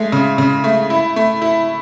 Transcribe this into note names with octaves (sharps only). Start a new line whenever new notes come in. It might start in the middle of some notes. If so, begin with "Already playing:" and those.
Already playing: G#3 A3
C#3
C#3
A3
E4
A3
E4